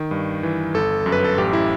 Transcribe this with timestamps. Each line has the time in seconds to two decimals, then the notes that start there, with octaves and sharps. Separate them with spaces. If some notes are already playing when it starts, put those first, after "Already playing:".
Already playing: D#3
0.11 G2
0.43 E3
0.74 G1 A4
1.06 F#2
1.12 B4
1.24 A4
1.38 A1 G4
1.53 E4